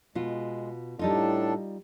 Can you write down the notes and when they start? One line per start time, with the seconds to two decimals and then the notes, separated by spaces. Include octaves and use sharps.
0.15 B2 G#3 F4
0.99 A2 G3 D4 D#4 F4 A4